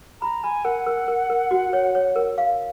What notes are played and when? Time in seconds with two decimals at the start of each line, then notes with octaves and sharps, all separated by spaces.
0.21 A#5 B5
0.44 G#5 B5
0.65 A#4 F#5
0.86 A#4
1.08 A#4
1.30 A#4
1.51 F#4
1.73 C#5
1.95 C#5
2.16 A#4
2.38 F5